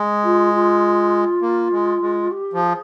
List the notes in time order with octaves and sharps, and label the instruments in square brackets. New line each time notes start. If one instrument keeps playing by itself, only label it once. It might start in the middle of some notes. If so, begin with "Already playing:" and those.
Already playing: [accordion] G#3
[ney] F4
F4
[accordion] A#3
G#3
G#3
[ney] G4
[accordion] F3
[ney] G#4